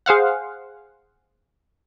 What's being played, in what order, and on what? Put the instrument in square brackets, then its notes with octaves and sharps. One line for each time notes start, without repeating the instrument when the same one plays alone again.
[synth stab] G#4 C5 F5 F#5